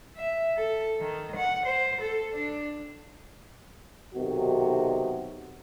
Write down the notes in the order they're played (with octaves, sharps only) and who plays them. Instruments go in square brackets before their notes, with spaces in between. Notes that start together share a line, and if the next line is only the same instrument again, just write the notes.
[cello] E5
A4
D#3
F#5
C5
A4
D4
[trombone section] B1 C3 D#3 F#4